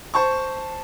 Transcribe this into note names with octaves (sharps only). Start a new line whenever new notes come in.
C5 A5 C#6